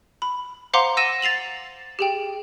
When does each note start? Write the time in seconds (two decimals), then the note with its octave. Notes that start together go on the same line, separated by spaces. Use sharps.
0.22 B5
0.74 C5 F5 F#5 A#5 C6 D6
0.97 F#5 E6 A#6 D#7 E7
1.22 A6 C7 F7 F#7
1.99 G4 G#4 G5